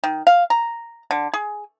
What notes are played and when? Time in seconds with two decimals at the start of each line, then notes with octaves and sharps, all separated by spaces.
0.04 D#3
0.27 F5
0.50 A#5
1.11 D3
1.34 G#4